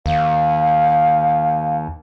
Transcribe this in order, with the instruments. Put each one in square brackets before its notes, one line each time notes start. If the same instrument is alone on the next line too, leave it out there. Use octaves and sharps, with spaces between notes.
[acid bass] D#2 [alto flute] F5